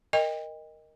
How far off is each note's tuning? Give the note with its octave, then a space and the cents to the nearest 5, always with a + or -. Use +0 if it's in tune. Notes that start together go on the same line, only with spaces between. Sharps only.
A#4 +0 D#5 +0 G5 +35